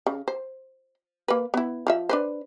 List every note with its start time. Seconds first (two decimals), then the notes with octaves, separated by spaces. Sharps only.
0.07 C#3
0.28 C5
1.28 A#3 B4
1.54 B3 E4
1.87 F3 F4 E5
2.09 D4 B4 C5